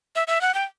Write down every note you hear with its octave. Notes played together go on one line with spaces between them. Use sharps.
E5
E5
F#5
G5